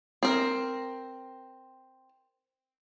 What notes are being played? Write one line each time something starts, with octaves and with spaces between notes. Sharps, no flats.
C4 A#4